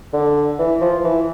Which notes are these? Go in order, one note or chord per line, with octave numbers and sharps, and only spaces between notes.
D3
E3
F3
E3